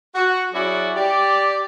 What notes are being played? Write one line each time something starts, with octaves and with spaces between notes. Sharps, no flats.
F#4
F#3 C#4 E4 F#4 G#4 D5
G4 D5